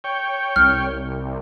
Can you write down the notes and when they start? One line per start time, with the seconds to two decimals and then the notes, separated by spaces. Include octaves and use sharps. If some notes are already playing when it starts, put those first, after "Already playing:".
0.04 C#5 G5
0.56 C2 F6